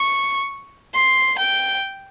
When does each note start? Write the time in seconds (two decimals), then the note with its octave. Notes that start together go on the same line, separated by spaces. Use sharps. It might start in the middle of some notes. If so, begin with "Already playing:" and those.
Already playing: C#6
0.95 C6
1.38 G5